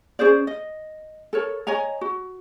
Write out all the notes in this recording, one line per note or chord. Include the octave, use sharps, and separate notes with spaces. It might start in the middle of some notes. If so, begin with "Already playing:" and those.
C#4 G#4 C5 D5
D#5
A4 A#4 C#5
C#5 D#5 G#5 A#5
F#4